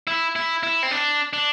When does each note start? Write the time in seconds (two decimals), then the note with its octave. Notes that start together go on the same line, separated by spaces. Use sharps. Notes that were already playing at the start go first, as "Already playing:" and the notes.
0.07 E4
0.36 E4
0.63 E4
0.83 C4
0.91 D4
1.33 D4